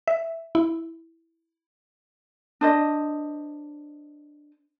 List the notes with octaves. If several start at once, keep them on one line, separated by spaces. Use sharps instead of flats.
E5
E4
D4 C5 D#5